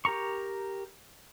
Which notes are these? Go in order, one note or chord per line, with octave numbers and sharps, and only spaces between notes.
G4 A#4 A#5 C#6